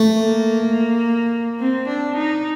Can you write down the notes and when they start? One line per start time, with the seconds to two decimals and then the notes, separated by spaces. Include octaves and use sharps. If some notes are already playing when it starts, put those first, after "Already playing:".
Already playing: A3
0.18 A#3
1.60 C4
1.88 D4
2.16 D#4